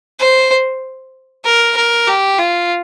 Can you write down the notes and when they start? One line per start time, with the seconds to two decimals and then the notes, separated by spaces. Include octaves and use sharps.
0.20 C5
1.45 A#4
1.76 A#4
2.07 G4
2.39 F4